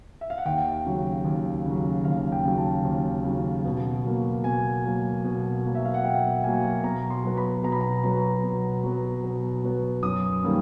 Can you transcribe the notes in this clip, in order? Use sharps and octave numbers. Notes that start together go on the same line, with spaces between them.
E5
F5
F#5
D#2 G5
C#3 F#3
D#2
C#3 F#3
D#2 F5
G5
C#3 F#3
A5
D#2
C#3 F#3
B2
F#3 A#3
B2 G#5
F#3 A#3
B2
F#3 A#3
E5
F5
F#5
B2 G5
F#3 A#3 G#5
B2 A#5
C6
F#3 B3
B5
B2 A#5
B5
A#5
F#3 B3 A#5
B2
F#3 B3
B2
F#3 B3
F#2 D#6
D#3 G3 A#3 C#4